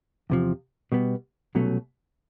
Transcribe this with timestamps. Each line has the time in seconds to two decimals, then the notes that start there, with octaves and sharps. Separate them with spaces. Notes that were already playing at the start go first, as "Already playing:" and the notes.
0.30 E2 C3 F3
0.92 B2 G3 B3
1.55 C2 B2 F#3 A3 C#4